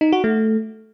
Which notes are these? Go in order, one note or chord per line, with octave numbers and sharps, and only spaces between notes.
D#4
F#4
A3